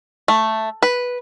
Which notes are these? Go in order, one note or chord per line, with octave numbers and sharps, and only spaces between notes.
A3
B4